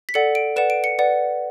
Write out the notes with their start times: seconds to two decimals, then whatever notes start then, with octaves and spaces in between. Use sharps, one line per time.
0.09 B6
0.14 A4 D5 F#5 C#7
0.35 D7
0.56 B4 D5 F#5 E7
0.70 D7
0.84 C#7
0.99 B4 D5 F#5